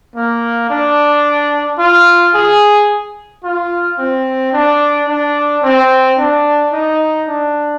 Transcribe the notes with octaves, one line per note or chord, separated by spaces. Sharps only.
A#3
D4
F4
G#4
F4
C4
D4
D4
C4
D4
D#4
D4